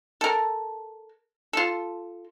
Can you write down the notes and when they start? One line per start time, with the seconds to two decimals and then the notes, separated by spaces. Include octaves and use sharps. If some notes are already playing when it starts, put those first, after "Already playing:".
0.21 A4 A#4
1.53 F4 A4